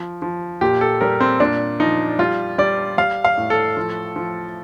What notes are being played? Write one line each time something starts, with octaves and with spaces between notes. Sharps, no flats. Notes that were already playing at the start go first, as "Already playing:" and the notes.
Already playing: F3
F3
A#2 G4
A4
G3 A#4
C4
A#2 D4
F3 D#4
G3 F4
G3 D5
G3 F5
F5
A2
A4
F3
F3